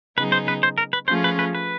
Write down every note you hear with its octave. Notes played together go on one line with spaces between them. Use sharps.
C#3 F#3 B3 D#4 G#4 B4
C5
B4
C5
A#4
B4
F3 A3 C#4 F4 G#4 C5
B4
B4
B4